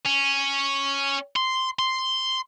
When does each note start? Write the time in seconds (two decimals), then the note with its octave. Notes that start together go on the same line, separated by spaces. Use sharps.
0.05 C#4
1.36 C6
1.79 C6